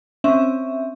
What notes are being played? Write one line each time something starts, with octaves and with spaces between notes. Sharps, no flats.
C4 C#4 E5